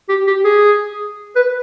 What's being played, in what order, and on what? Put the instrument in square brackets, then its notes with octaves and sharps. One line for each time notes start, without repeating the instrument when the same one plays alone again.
[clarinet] G4
G4
G#4
B4